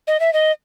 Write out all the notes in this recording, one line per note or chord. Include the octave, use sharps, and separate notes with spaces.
D#5
E5
D#5